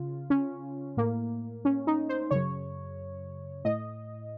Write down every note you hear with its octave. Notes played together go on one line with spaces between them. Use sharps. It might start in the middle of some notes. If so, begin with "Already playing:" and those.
Already playing: C#3 F4
C#4
A2 A#3
C#4
D#4
C5
F#2 C#3 C#5
A2 D#5